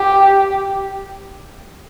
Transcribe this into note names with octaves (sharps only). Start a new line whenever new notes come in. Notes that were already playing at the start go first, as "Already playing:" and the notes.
Already playing: G4